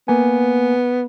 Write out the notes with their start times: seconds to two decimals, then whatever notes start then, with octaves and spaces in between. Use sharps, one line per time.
0.08 A#3 B3 G#5